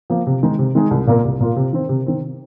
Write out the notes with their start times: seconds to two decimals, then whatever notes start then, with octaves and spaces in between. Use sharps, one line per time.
0.10 F3 A#3
0.27 C3
0.43 D#3 G#3 D#4 G#4
0.59 C3
0.75 D#3 G#3 D#4 G#4
0.91 C2
1.07 A#2 A#3 F4 A#4
1.25 C2
1.40 A#2 A#3 F4 A#4
1.56 C3
1.73 D#3 C4
1.89 C3
2.06 D#3 C4